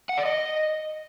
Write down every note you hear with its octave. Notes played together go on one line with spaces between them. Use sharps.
F#5
D5
D#5